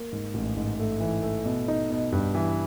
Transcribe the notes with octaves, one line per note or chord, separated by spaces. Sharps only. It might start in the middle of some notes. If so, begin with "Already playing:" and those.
Already playing: A#3
G#2
A1
G#2
A3
E3
A3
B2
D#4
B2
G2
E3